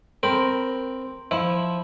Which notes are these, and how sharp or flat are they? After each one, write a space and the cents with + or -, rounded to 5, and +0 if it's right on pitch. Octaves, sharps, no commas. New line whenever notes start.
C4 +0 A#4 +0 B5 +15
F3 +0 E4 +0 E5 +0